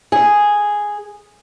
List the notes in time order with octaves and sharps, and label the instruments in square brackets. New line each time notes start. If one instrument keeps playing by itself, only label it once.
[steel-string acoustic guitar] G#4